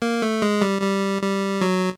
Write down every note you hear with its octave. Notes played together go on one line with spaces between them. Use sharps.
A#3
A3
G#3
G3
G3
G3
F#3